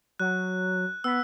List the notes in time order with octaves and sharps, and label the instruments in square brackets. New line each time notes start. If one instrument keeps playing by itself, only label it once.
[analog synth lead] F#3 [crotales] F#6
[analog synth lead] B3 [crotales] E6 B6